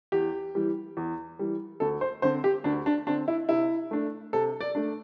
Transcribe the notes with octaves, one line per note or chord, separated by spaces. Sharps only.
E2 G4
E3 G3
E2
E3 G3
D2 A4
C5
D3 C4 C5
G4
D2 D4
D4
D3 C4 D4
E4
C3 E4
A3 D4
C3 A4
D5
A3 D4